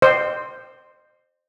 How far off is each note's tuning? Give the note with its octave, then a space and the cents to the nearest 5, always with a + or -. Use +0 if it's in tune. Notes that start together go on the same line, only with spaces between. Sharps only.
C5 +0 D#5 -35